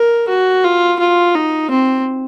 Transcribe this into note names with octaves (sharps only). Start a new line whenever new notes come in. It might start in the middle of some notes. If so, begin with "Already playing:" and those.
Already playing: A#4
F#4
F4
F4
D#4
C4